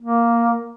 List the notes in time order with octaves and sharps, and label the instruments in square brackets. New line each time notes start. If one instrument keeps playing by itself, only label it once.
[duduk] A#3